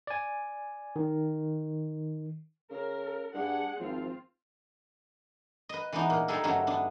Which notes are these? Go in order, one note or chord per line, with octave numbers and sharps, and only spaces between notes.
D5 G#5
D#3
C#3 A#4
G2 D4 G#4 F#5
G#1 F3 C4 F4
B4 D#5
E3 G#3 B3 D4 D#4
A#2
G3 G#3 D#4 G#4 A4
G2 D3 F#3 A3 C#4 D4
B3 D4